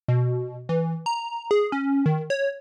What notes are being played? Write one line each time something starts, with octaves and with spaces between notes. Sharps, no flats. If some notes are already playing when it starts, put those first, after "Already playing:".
B2
E3
A#5
G#4
C#4
D#3
C#5